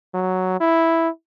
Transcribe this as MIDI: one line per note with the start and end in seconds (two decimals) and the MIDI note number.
0.14 0.59 54
0.60 1.09 64